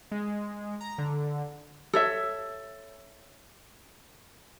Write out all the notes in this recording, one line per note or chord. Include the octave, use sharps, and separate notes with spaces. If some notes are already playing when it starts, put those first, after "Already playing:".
G#3
A#5
D3
A4 C#5 E5